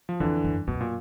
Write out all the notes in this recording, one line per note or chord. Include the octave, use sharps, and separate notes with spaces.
F3
F2 D3 E3
F#2
F#2 B2
A#2